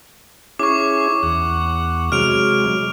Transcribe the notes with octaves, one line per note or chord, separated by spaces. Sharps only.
C#4 E4 G#4 C#6 D6
E2 F#5
C3 F#3 G#3 F6 D7 F7